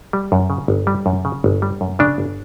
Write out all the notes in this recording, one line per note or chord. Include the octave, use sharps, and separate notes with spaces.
G3
F#2
C#3
G1
G3
F#2
C#3
G1
G3
F#2
C#3 D4
G1